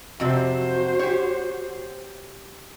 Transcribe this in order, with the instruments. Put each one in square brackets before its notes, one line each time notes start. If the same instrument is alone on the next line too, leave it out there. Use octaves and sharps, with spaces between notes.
[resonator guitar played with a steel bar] F2 C3 [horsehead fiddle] F#4 C5
[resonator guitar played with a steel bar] G4 C#5